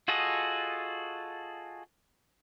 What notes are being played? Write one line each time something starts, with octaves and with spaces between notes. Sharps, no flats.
F4 F#4 G#4 A4 D#5